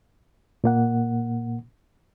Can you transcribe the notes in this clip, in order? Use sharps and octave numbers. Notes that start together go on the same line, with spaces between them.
A#2 A#3 F#5